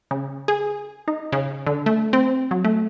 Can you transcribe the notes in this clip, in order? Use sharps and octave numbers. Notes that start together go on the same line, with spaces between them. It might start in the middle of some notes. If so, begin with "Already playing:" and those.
C#3
G#4
D#4
C#3
D3
A3
C4
F#3
A3